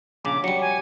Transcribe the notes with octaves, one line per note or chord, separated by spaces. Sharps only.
A#1 C#3 D6
F#3 G3 C#7
G#5